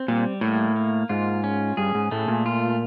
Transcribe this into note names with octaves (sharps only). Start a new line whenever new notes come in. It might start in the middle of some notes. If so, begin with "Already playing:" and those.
Already playing: C4
A#2 G3
A2 A#3
A#3
G#2 F4
C#4
G2 G#4
G#2
A2 A3
A#2
F4